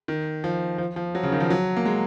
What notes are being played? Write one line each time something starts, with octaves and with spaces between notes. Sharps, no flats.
D#3
F3
F3
F3
F#3
C#3
D#3
F3
F#3
A#3
G#3